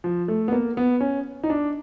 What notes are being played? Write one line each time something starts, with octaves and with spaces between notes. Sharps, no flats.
F3
A3
B3
A#3
B3
C#4
D#4
D4